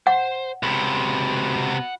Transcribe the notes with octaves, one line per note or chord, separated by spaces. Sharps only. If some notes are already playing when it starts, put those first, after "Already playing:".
C5 F#5
C#2 C3 F#4 B5